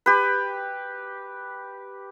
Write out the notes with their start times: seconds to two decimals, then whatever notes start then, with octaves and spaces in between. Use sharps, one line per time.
0.06 G4 B4